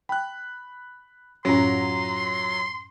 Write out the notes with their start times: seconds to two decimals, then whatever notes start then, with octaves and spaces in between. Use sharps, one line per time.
0.09 G5 B5 F#6
1.45 F#2 A2 F#3 C#4 F4 A#5 C6